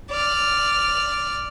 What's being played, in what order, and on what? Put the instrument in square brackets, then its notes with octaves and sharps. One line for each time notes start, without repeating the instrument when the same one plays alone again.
[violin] D5 F6